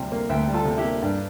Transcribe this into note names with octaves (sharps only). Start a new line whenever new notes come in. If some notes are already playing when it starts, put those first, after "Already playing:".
Already playing: D2 C3 G3
A#3
D2 E5 G5
G3
F4 A4
C3
E4 G4
A#3
G2 D4